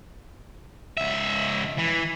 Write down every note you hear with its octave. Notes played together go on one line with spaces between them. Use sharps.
C#2 E5
E3